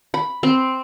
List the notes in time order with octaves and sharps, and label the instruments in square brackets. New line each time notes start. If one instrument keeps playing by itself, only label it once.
[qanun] B5
C4